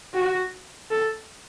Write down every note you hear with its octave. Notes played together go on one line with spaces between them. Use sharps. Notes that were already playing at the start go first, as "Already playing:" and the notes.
F#4
A4